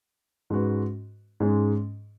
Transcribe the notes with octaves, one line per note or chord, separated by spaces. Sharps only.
G#2 G#3 C#4 F#4 B4
G#2 G#3 C#4 G#4